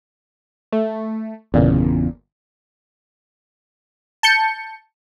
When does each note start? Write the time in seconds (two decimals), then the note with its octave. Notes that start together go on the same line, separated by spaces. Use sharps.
0.72 A3
1.54 G1 E2 A#2 C#3
4.23 A5 G6 C#7